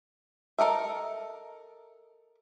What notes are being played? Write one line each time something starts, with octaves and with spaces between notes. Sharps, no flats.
A4 A#4 D#5 E5